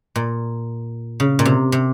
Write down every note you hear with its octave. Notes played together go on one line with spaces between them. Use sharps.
A#2
C#3
A#2
C3
C3